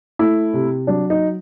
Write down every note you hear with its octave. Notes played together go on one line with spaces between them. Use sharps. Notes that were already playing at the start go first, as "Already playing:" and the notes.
A3 E4
C3
F#3 D4
D#4